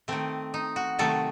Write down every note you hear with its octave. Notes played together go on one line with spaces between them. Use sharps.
D#3 A3 C4
D#4
F#4
C3 D#3 F#3 A3 A4